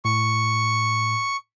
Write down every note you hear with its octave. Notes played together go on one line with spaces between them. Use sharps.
A2 C#6